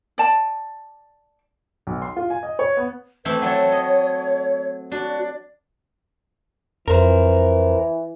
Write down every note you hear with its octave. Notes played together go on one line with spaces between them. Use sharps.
D5 A5
B1
C6
F4
G#5
D#5
C#5
B3
E3 A3 C4 B4
F#3 A4 C#5
D#5
D4 F#4
F2 E3 A#4 C5